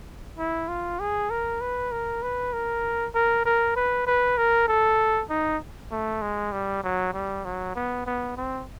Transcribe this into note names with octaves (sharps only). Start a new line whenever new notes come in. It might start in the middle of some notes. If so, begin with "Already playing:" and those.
E4
F4
G#4
A#4
B4
A#4
B4
A#4
A#4
A#4
B4
B4
A#4
A4
D#4
A3
G#3
G3
F#3
G3
F#3
B3
B3
C4